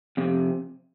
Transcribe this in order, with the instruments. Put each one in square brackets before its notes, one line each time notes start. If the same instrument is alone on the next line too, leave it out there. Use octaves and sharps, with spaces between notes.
[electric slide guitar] F2 C3